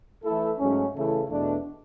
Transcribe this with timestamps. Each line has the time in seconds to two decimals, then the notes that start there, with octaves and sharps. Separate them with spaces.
0.23 E3 A3 E4 A4
0.58 G#2 F#3 A3 C#4
0.93 C#3 E3 A3 E4 A4
1.28 E2 B2 A3 D4